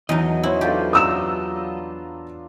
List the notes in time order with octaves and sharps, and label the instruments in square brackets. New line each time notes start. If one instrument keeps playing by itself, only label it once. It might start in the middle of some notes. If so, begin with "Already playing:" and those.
[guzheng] E2 D#4 [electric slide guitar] F#3 D#5
[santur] C#4 B4 C5 [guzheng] E4
[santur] D4 F4 A4 [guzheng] G4
[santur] B4 A#5 [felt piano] D#6 E6 E7